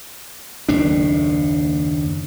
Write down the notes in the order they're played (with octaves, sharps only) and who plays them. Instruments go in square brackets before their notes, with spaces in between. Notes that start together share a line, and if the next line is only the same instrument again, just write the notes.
[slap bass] F#1 D#2 A2 D4